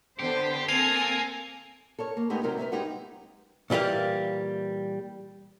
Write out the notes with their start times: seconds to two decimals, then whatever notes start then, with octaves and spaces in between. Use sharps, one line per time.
0.19 D3 B3 G4 C5
0.69 A#3 C4 A4 G#5 F7
1.99 A4 A#4 C#5
2.17 A#3
2.30 G#3 A3 B3 D#4 G4
2.43 C3 F#3 A3 D#4 A#4 C5
2.58 A#4 B4 C#5 E5
2.72 F#3 G#3 B3 C4 D#4 G4
3.70 A#2 E3 G3 A#3 F5